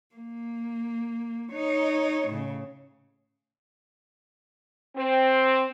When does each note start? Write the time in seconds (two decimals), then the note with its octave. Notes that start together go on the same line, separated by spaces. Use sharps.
0.15 A#3
1.52 D#4 C#5
2.28 A2 C#3
4.96 C4